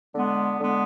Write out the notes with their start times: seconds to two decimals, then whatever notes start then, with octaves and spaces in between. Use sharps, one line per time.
0.14 D3 G#3 B3
0.59 D3 G#3 B3